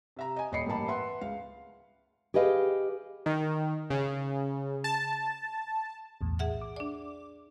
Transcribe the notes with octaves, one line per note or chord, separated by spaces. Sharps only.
C3 E5 A#5
D#5 G#5
D#1 C#5 D#5 B5 C7 C#7
A1 G2 A#3 G4 A5 B5
B4 E5 F#5 C6
C#2 F5
G4 G#4 B4 D#5 F5
D#3
C#3
A5
B1 E2 A2
G#4 E5 F#5
D6
D4 D5